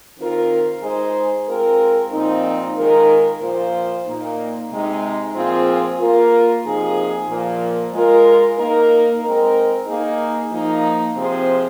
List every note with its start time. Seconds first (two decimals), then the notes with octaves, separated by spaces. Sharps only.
0.18 D#3 C4 F4 A#4
0.82 G#3 D#4 G#4 C5
1.48 G#3 C4 F4 A#4
2.12 A#2 F3 C4 D#4
2.76 D#3 G#3 F4 A#4
3.41 A#2 F3 A#3 F4 C5
4.06 A#2 A#3 D#4
4.71 C3 G#3 D#4
5.35 A#2 F3 C4 F4 G#4
5.99 A#3 F4 A#4
6.64 C3 F3 A#3 D#4 G#4
7.29 A#2 F3 A#3
7.93 G#3 F4 A#4
8.57 A#3 D#4 A#4
9.23 G#3 C4 D#4 A#4
9.87 A#3 D#4 G#4
10.51 F3 A#3 D#4
11.16 C3 F3 C4 G#4 C5